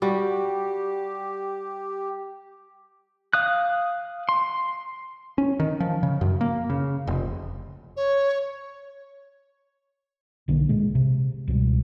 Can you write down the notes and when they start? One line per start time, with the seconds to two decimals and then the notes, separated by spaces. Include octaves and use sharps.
0.02 G3 F#4 G4
3.33 F5 D#6 F#6
4.29 C6
5.38 C#4
5.60 D#3
5.80 F3
6.03 C#3
6.21 F#2
6.41 A#3
6.70 C#3
7.07 F1
7.96 C#5
10.48 B1 D3 D#3 A#3
10.69 A#2 G#3
10.95 C3
11.48 C#2 B2 F3 G3